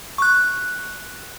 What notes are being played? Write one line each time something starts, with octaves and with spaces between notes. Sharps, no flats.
C#6 F#6